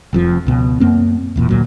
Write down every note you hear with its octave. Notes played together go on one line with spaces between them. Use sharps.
F1 F2 F3
C#2 B2
F#2 A#3 C4
E1 E2 A#2
D2 A#2 F#3